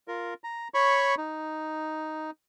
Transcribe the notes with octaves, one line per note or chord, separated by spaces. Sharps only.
F4 A#4
A#5
C#5 B5 C#6
D#4